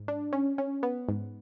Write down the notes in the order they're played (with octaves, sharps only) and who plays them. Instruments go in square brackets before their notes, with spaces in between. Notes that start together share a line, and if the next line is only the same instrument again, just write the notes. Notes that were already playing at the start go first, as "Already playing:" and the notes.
Already playing: [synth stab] G#2
D4
C#4
C#4
B3
G#2